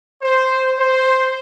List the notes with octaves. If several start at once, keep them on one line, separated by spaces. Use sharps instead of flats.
C5
C5